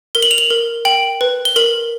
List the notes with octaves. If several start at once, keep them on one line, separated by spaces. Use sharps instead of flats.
A#4 G7
F#7
F7
F#7
A#4
G5 F#7
B4
G7
A#4 F#7